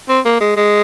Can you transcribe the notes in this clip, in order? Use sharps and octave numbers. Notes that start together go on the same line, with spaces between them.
C4
A#3
G#3
G#3